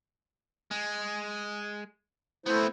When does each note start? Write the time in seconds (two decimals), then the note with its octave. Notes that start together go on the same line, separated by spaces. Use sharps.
0.71 G#3
2.46 A3 B3 C4 E4 C5